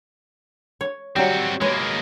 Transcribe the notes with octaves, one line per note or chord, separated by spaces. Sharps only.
C#5
F#3 G3 C4 F#4
G#3 A#3 B4 C#5